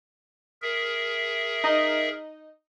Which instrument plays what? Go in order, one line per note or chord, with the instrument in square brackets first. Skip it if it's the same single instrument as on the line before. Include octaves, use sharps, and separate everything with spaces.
[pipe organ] G#4 A#4 E5
[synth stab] D#4 D#5